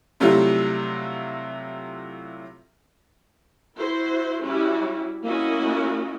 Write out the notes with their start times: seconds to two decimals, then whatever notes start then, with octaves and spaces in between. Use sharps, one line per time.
0.20 C3 F#3 G3 A3 E4 F4
3.77 E4 F#4 C5
4.44 G3 C#4 E4 F#4
5.23 A#3 C#4 E4 F#4 D#5